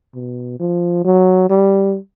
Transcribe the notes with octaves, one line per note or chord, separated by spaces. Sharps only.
B2
F3
F#3
G3